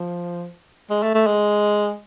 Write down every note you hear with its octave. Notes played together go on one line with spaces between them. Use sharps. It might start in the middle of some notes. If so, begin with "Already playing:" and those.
Already playing: F3
G#3
A3
A3
G#3